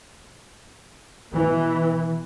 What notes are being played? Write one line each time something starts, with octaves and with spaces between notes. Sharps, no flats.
B2 E3